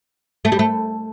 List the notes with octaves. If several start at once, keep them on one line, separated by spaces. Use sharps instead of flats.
A3
G3
A3